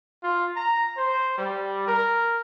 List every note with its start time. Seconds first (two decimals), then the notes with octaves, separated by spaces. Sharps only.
0.23 F4
0.56 A#5
0.97 C5
1.38 G3
1.87 A#4